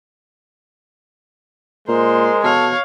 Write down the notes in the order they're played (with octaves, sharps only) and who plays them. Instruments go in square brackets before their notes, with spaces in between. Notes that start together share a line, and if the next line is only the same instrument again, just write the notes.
[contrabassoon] A#2 [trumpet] G#3 [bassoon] A#4 [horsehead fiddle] C5
[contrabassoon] B2 [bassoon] A4 [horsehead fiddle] C#5 F5